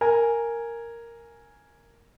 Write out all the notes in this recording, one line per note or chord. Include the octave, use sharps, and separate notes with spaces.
A#4 G#5